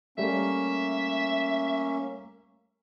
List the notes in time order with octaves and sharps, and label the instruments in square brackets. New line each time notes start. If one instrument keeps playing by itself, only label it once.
[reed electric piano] G3 A3 [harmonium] A#3 C#4 [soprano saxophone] E5